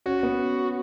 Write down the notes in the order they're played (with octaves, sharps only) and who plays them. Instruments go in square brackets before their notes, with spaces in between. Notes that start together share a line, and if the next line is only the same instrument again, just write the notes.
[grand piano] C#4 [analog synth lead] F#4
[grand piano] B3